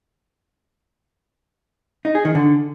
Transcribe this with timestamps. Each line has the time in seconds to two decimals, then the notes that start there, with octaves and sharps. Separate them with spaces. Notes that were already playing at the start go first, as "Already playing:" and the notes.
2.05 D#4
2.15 G#4
2.25 D#3
2.35 D3